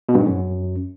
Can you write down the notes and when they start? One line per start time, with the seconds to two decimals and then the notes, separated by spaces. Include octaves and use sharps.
0.09 B2
0.15 G2
0.21 G#2
0.27 F#2